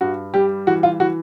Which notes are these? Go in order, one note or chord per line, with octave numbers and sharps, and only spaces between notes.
G2 F#4
G3 G4
E3 F#4
F4
E3 F#4